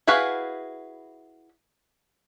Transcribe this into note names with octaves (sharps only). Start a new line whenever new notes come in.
E4 F#4 G#4 B4 F5